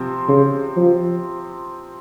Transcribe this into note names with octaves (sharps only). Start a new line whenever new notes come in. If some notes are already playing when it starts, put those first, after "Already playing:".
Already playing: C3 F3 C4
C#3
F3